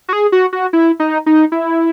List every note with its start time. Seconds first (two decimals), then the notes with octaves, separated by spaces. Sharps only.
0.08 F#4
0.13 G#4
0.32 F#4
0.53 F#4
0.73 E4
1.00 D#4
1.26 D#4
1.52 E4